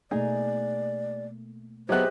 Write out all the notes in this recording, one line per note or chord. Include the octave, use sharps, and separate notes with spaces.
B2 A3 A#3 D#4 G#4 D5
F#3 B3 G4 G#4 C5 D#5 E5 F#6